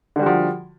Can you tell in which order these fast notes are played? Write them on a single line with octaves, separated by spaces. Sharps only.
D3 G3 F#4 F3